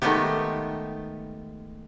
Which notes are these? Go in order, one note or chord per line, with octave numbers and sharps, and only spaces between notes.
D#3 G#3 A3 B3 G4